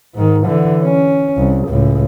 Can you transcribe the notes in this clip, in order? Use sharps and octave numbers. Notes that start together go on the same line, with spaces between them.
G#2 D#3
D3 E3
C#4
C2
C#2 A2